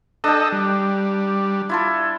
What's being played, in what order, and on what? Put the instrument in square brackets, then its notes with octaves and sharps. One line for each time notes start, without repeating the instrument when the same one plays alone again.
[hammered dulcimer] D4 G5 [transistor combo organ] A4 D#5
[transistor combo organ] G3
[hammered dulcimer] E4 F4 A4